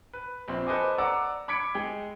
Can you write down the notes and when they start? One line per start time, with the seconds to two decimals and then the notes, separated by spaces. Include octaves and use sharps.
0.13 B4
0.48 A#1 C4 B5 C6
0.67 A4 B4 C5 D#5 G#5 D6
0.98 D5 F#5 A#5 D6 E6
1.48 B5 D6 G#6 B6 C#7 D7
1.75 G#3 G#4 G5